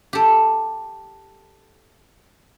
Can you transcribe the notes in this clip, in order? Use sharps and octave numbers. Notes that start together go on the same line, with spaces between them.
G4 A4